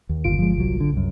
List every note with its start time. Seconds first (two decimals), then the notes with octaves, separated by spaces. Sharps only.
0.09 D#2
0.24 G1 F4 D7
0.39 F3 G#3
0.57 C2 F#3
0.80 D3
0.93 C2 F#2